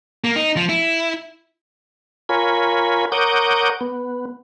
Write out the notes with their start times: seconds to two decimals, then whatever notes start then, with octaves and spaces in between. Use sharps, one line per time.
0.24 A#3
0.36 D#4
0.57 F3
0.69 E4
2.29 F4 A#4 C#5 G#5 B5
3.12 A#4 C#5 F#5 D6 D#6 G6
3.81 B3